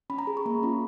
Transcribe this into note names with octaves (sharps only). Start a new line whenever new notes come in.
C#4 B5
A#5
G#4
C#6
A#3 B5
C#4 F4